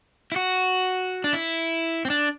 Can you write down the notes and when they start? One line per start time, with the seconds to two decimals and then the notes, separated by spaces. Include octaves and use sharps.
0.32 E4
0.36 F#4
1.24 D4
1.33 E4
2.05 C4
2.10 D4